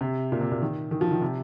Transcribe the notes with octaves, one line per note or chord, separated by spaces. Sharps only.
C3
A#2
C3
A#2
D#3
D#3
F3
D#3
C3